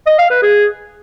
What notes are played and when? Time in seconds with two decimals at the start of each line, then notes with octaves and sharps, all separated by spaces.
0.07 D#5
0.18 F5
0.30 B4
0.42 G#4